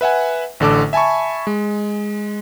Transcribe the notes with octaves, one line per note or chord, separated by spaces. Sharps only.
B4 E5 F#5 G#5
A1 D3 A4 D6
E5 G#5 A5 B5 C#6
G#3